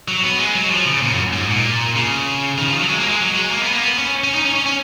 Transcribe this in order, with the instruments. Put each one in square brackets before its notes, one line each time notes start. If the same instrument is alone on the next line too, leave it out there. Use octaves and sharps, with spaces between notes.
[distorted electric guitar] F#3
B3
G#3
F#3
F3
C#3
A#2
F#2
G#2
A#2
C#3
D#3
F3
F#3
G#3
A#3
G#3
F#3
G#3
A#3
B3
A#3
B3
C#4
C#4
D#4
C#4
C#4
C#4